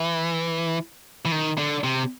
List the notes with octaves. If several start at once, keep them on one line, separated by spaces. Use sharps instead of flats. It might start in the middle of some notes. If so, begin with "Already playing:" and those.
Already playing: E3
E3
D#3
D3
C3